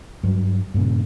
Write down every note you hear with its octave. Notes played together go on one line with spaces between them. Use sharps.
G2 F#3
G2 A#2 C#3